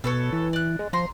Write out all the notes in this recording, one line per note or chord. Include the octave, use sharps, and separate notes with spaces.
B2 A4 B4 C#5
E3
D5 F#6
G#3
F3 A#5 C6